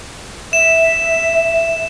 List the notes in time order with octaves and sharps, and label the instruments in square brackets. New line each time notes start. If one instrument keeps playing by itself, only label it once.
[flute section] E5 [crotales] E7